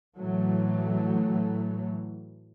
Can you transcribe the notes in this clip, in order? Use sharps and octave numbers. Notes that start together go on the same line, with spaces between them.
A2 E3 F#3 A3